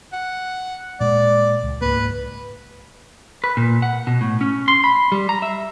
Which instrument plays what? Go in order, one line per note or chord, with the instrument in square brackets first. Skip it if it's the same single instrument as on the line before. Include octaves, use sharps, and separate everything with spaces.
[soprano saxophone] F#5
[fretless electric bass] A#2 G#3 [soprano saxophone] D5
[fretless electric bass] C#2
[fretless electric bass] C#2 G#2 A#3 [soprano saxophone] B4
[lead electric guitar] B4
A#2
F#5
B2
A2
C#4
C6
B5
G3
A#5
E5